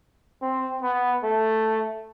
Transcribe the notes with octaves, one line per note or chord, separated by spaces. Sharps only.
C4
B3
A3